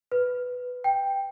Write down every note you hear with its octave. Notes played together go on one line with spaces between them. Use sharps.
B4
G5